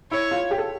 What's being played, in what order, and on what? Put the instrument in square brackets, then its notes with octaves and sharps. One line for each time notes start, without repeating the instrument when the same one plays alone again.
[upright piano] E4 [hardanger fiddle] C#5
[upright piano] F4
G4
A4